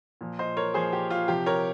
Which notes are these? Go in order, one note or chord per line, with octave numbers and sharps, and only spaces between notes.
A#2 F3
C5 D#5
A#4 C#5
A#2 F3 G#4 C5
G4
F4
C3 F3 G4
A#4 C#5